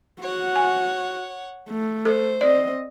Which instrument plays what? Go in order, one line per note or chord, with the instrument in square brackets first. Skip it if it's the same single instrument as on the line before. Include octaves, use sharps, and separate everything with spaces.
[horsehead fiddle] F#4 [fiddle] C#5 F#5
[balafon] G#5
[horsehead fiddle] A3
[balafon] A4 [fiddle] C5
[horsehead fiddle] C4 D#5 [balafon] D5